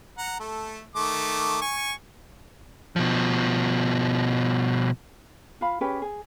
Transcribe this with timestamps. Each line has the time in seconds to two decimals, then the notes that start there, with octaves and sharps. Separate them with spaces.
0.18 F#5 A#5
0.40 A3 A4
0.95 D#3 A3 D6
1.62 G#5 C#6
2.96 B2 F3
5.61 F4 F5 B5
5.81 C#4 G4 G#4 B4
6.02 G#4